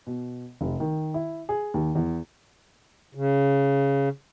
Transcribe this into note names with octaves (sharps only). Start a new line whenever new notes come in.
B2
F1
D#3
E4
G#4
D#2
E2
C#3